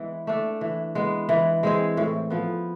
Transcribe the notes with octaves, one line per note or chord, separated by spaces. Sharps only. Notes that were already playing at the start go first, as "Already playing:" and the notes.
Already playing: E3 G#3 B3 E4
A3 D4
E3
G#3 B3
E3
G#3 C4 G#4
A2
F3 B3